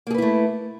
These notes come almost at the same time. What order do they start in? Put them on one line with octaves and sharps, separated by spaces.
A#3 G#4 B4 E4 A3